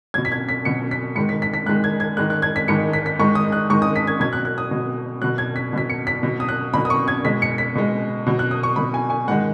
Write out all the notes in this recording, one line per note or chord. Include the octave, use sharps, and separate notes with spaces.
B2 F#3 G#6
B6
G#6
B6
B2 F#3 C#7
B6
G#2 D#3 G#3 C#7
B6
B6
B6
G#2 D#3 G#3 F#6
G#6
G#6
G#2 D#3 G#3 F#6
F#6
G#6
B6
G#2 D#3 G#3 C#7
B6
B6
G#2 D#3 G#3 C#6
D#6
F#6
G#2 D#3 G#3 C#6
D#6
B6
G#6
B2 F#3 G#6
F#6
F#6
D#6
B2 F#3
B2 F#3 F#6
G#6
B6
B2 F#3 B6
C#7
B6
B2 F#3
D#6
F#6
B2 F#3 B5
D#6
C#6
G#6
B2 G#3 B6
C#7
B6
B2 G#3
B2 F#3
F#6
D#6
C#6
B2 F#3 B5
G#5
G#5
G#2 D#3 G#3 F#5